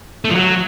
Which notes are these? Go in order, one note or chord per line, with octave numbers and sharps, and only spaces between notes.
A3
F3
F#3